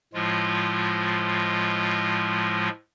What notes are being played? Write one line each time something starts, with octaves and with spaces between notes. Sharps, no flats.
A2 F3 G#3 F4